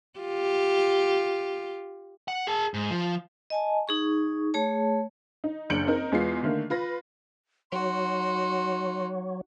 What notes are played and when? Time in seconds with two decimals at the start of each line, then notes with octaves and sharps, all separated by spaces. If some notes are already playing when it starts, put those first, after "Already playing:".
0.19 F4 G4
2.28 F#5
2.47 G#4 A5
2.74 G#2
2.91 F3
3.50 D#5 G#5 A5
3.87 D#4 G#4 C#6
4.54 A3 G#4 C#5 A5
5.44 D#4
5.70 F#1 D4 G6 C#7 D7 F#7
5.87 C4 D#4 A#4
6.12 E2 G#3 B3 F4 C7
6.43 D3 D#3 A3 A#3
6.70 F4 B4 A#6
7.72 F#3 D#4 F#4 C6